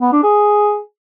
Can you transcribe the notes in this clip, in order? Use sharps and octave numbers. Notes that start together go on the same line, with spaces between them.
B3
D4
G#4